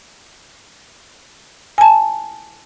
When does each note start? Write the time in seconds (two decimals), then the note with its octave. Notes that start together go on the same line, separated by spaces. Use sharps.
1.78 G#5 A5